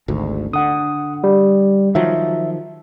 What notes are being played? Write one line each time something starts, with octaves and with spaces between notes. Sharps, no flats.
G#1 D2
D3 F#5 D#6
G3
D#3 F3 F#3 E5